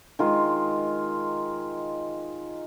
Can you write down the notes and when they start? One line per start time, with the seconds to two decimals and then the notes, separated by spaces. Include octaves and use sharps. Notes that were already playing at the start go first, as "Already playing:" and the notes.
0.19 D#3 G#3 F4